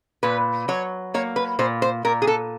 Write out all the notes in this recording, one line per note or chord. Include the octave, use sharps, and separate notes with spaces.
A#2 B4
F#3 C#5
A#3 C#5
B4
A#2 C5
C5
A#2 A#4
G#4
A4